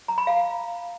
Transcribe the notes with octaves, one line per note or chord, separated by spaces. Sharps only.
A#5
B5
F5